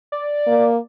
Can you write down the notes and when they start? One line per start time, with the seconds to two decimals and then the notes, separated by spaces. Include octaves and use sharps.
0.12 D5
0.47 A#3